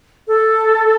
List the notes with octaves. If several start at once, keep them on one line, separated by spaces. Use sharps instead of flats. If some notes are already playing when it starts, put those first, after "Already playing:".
A4